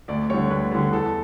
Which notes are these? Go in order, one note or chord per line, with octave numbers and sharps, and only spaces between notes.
D2 D5
D3 G3 C#5
D2 B4
D3 G3
E2 A4